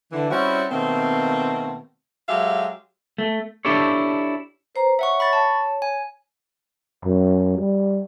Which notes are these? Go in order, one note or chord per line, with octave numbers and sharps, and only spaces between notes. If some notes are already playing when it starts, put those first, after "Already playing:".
D3 E3
G3 C4 C#4 E4 F#4
B2 D#3 A3 A#3 C4
F#3 G#3 G4 A4 E5 F5
A3
D4 E4 G4 A4 C#5
B4 C5 A#5
C#5 E5 F#5 C#6
B5 C#6 A6
A5
G#5
F#2
G3